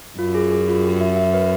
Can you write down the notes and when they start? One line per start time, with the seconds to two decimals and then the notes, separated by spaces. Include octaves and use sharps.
0.18 F#2 F4
0.35 G#4
0.51 G#4
0.68 F4
0.84 G4
1.00 E5
1.17 E5
1.34 B4